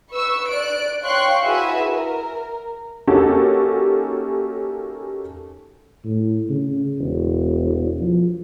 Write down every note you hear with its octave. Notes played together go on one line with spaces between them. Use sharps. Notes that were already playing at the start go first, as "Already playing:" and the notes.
B4 C#6 E6
D5 F#6 D7
C#5 F5 G5 C6 C#6 F#6
E4 F#4 G#4 B4 E5 G#5
A#4
A#3 C#4 D#4 F#4 G4 A4
A2
C#3
E1
F3